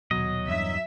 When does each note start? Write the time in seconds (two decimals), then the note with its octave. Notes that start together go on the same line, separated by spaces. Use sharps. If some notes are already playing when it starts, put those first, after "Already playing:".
0.11 D#1 B2 F#3 D#5
0.48 E2 G2 E5